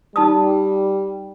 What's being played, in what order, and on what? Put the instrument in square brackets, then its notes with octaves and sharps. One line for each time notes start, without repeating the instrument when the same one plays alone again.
[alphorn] G3 [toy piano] D#4 A5 D#6